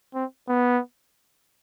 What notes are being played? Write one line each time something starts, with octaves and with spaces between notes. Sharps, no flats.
C4
B3